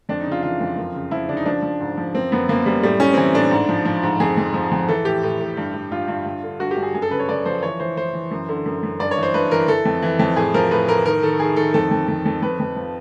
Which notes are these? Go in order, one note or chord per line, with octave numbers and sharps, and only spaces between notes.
F2 D4
D#4
C#3
F4
E3 F4
F2
F#2
C#3
F3 E4
C#3 D4
D#4
F3 D4
F3
G#2
F3
F#2 C4
F#2 B3
F#2 A#3
F#2 G3
A2 G3
A2 C#4
C4
E3 C#4
A2 D4
G#2
F3
F3
G#2
F2 G#4
F2
F3
F2
E3 A4
A2 G4
A2
A2
G2
G2
G2 F4
G2
G2
D3
G2 F#4
G4
G2
G#4
F#2 G#4
A4
C#3 B4
C#5
F#2 D5
F3 C5
E3 C#5
E3 C5
E3 C5
E3
F#2
D3
F#2
F#2
G2 D5
C#5
E3
C5
G2 B4
E3 A#4
E3 A4
F2
E3
F2
A2 G#4
F3 A#4
A2 B4
A2 A#4
D#3 A#4
D#3 A4
D#3 G#4
D#3 A4
F2 A4
F2
F2
F2
F2 B4
F2
F3